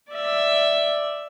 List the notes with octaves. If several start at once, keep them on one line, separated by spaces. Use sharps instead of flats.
D5 E5